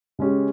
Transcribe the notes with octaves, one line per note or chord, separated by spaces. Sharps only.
C#3 G#3 C#4 G4